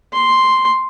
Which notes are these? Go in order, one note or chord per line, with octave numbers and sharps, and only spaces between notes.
C6